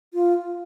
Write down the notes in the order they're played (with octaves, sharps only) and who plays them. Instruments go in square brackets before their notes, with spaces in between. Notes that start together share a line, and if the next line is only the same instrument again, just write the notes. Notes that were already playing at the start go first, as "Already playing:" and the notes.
[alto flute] F4